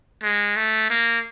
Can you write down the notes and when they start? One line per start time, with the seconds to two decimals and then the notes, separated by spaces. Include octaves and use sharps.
0.23 G#3
0.56 A3
0.90 A#3